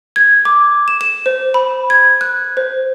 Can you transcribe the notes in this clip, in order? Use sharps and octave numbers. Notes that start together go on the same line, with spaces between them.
G#6
D6
E7
E7
C5
B5
G#6
F#6
C5